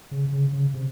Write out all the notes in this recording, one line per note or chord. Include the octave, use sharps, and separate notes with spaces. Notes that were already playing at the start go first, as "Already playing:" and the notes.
C#3
C#3
C#3
C3